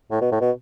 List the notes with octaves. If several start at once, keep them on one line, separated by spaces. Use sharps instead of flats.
A2
B2
A2
B2